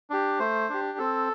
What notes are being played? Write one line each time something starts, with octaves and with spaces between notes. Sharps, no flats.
D4 G4
A3 C5
D4 G4
C4 A4